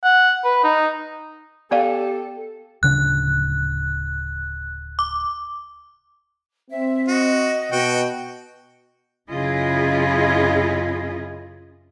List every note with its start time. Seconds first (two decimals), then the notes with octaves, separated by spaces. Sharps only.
0.04 F#5
0.44 B4
0.64 D#4
1.71 B3 G4 A4 D5 F5
2.83 D1 C#3 D4 F#6
4.99 D6
6.70 C4 E5
7.08 F#4 D#5
7.72 B2 F#4 G5
9.31 F#2 C#3 E4 F4 G#4 D#5